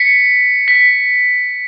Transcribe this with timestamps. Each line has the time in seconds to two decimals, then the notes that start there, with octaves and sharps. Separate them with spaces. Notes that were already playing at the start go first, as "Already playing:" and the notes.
Already playing: B6 C#7
0.68 B6